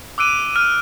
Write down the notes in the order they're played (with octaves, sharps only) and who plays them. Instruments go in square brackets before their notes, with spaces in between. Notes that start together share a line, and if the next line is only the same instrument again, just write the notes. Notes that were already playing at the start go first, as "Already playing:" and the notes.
[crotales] D6 E6 F#6 D7 D#7
F6 D#7